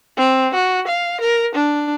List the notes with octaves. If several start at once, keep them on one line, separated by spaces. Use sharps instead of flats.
C4
F#4
F5
A#4
D4